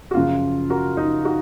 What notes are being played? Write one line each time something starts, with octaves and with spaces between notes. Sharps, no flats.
F#4
F#2 C#3 F3 F4
F#4 A#4
D#4
D#4 F#4